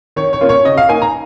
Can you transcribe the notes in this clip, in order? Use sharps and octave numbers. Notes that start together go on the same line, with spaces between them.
D#3 C#5
C#5
A#3 C#4 F4
C#5
C#3 D#5
F5
A#3 D#4 G#5
A#5